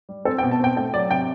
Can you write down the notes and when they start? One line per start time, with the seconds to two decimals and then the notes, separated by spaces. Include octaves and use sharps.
0.09 G3
0.25 C4 A4
0.38 G5
0.43 B2
0.51 A5
0.60 C4 G5
0.77 A3 G5
0.94 F#3 D5
1.11 C3 G5